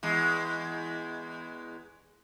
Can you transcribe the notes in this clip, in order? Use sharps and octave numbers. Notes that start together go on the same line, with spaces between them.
E2 G#3